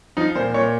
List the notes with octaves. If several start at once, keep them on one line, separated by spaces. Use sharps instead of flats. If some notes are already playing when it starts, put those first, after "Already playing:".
F3 D#4
A#2 C5
A#2 C#5